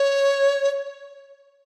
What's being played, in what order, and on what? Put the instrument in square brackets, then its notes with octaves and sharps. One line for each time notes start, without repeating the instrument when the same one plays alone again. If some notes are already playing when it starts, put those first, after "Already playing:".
Already playing: [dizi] C#5